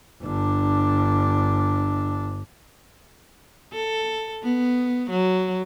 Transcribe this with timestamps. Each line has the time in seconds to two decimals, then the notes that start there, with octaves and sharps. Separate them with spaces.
0.22 G1 D4
3.73 A4
4.43 B3
5.10 F#3